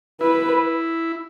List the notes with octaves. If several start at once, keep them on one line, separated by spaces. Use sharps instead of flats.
E4 B4